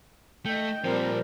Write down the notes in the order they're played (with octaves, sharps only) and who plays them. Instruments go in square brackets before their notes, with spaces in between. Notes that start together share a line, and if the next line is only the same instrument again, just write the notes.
[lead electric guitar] A3 [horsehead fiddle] D#5 G5
[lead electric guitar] A#2 F3 [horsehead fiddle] G3 [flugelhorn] C4 [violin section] A#4 C5